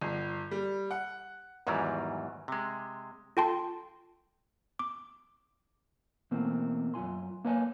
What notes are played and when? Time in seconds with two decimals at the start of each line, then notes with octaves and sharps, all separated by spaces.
0.01 G1
0.51 G3
0.91 F#5
1.67 E2 G#2 D#3 E3 F#3 G3
2.48 C3 G#3
3.37 F4 A4 G5 A5 C6
4.79 D6
6.31 B2 E3 A3 A#3 C4
6.94 F#2 F4 G#5 C6
7.44 A#3 B4 C#5 E5 G#5